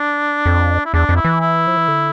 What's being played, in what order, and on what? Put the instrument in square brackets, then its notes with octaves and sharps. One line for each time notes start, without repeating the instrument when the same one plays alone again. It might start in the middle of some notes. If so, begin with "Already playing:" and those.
Already playing: [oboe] D4
[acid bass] F2
[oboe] E4
[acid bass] E2 [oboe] D4
[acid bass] F2
[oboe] E4
[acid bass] E3
[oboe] E4
[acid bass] F3
E3
D3